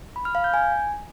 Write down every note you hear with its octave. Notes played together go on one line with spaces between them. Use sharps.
B5
F6
F5
G6
G#5